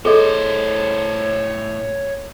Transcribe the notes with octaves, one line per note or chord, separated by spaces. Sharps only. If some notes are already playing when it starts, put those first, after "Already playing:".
A2 G#4 A4 C5 C#5 D#5